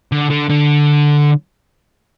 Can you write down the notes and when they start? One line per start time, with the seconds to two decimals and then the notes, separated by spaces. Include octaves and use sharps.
0.12 D3
0.30 D3
0.50 D3